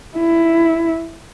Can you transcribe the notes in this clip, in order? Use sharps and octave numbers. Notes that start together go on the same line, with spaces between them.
E4